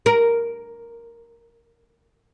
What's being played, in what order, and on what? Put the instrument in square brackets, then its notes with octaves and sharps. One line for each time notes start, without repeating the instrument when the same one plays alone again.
[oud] A#4